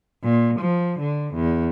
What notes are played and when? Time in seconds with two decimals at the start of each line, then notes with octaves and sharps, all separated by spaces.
0.24 A#2
0.60 F3
1.02 D3
1.35 E2